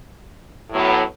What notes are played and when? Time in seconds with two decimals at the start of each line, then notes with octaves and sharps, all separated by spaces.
0.70 A2 F#3 B3